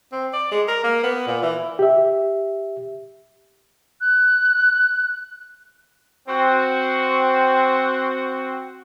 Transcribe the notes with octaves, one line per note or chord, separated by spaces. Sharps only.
C4
D5
G#3
A#4
A#3
B3
A#2
E3
G4 E5
F#6
C4 F#4